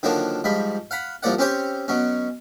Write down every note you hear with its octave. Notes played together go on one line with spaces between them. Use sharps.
D3 D#3 F3 F#3 A#3 D4
G#2 F3 G3 B5
F5 F#5 B5
C2 F3 A#3 D5 F#5
C4 C#4 G4 C5 C#5
B2 F#3 C#4